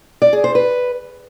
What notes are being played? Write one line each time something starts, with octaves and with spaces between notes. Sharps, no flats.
D5
G#4
C5
B4